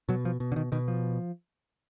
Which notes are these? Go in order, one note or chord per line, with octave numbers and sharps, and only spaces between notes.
B2 F#3
F3
B2
D3
D#3
B2 D#3
F3